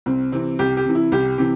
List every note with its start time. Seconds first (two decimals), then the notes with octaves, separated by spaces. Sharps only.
0.06 C2 C4
0.32 C3 E3 C4
0.59 C2 G4
0.77 G4
0.85 C3 E3
0.95 E4
1.12 C2 G4
1.38 C3 E3 G4